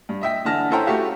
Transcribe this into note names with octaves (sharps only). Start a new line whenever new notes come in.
G2
D#5 E5 G5 B6
D3 E3 A5 F6 A#6
C#4 E4 A4 C5 G5 A#5
A3 F#4 G4 E5 F5